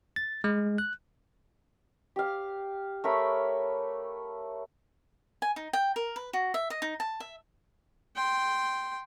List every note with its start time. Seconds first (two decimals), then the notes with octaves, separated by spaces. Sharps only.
0.16 A6
0.44 G#3
0.78 F#6
2.16 G4 F5
3.04 A3 A#4 C#5 B5
5.42 G#5
5.56 D#4
5.73 G5
5.96 A#4
6.16 B4
6.33 F#4
6.54 E5
6.70 D#5
6.82 D#4
7.00 A5
7.20 E5
8.16 G5 C6